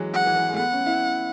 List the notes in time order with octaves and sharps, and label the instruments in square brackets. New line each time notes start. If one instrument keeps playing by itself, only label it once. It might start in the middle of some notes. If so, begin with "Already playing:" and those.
Already playing: [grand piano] E3 F#3 G#3
[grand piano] G#3 [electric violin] F#5
[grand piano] E3
E3
G#3
A3
[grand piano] B3 [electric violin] F#5
[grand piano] C#4
E4